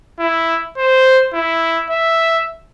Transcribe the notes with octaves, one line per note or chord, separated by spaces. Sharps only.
E4
C5
E4
E5